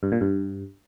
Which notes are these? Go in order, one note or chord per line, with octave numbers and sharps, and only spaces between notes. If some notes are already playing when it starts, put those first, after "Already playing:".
G2
A#2
G2